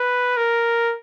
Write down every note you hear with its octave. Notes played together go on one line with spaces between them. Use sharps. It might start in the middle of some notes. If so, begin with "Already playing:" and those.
Already playing: B4
A#4